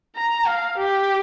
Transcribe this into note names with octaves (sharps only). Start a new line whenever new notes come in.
A#5
F5
G4